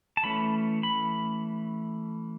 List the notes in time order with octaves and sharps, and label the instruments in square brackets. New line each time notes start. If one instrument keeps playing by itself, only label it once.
[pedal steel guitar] A5
E3 A3 C#4 B5
B5